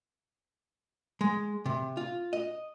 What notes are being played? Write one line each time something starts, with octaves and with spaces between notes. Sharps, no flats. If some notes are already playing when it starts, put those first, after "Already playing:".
G#3
C3
F4
D#5